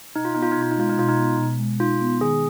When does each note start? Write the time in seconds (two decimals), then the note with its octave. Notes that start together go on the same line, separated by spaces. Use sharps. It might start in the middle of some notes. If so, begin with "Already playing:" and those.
0.15 B2 D#4
0.25 F4
0.34 B3 D#4
0.43 F4
0.52 D#4
0.57 B2 F4
0.71 D#4
0.77 G#3 F4
0.89 D#4
0.98 B2 F4
1.09 D#4
1.18 B3
1.38 B2
1.59 G#3
1.79 D#4 F4
2.01 B3
2.21 D#3 G#4